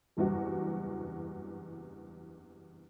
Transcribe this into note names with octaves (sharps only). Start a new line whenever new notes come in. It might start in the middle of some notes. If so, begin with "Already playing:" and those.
F#1 E2 G2 F#4